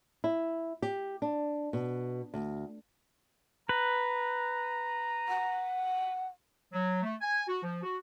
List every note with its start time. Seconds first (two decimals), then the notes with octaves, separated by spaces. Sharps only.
0.24 E4
0.82 G4
1.22 D4
1.73 B2
2.34 D2
3.69 B4 A#5
5.28 F#5
6.73 F#3
7.03 A3
7.21 G#5
7.48 F#4
7.63 F3
7.83 F#4